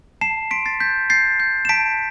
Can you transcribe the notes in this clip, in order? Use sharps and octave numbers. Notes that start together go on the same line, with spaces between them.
A5 C7 E7
C6 B6 D7
A6 C7
G6 B6
G6 A6 C7
G6
E7
A5 B6 D7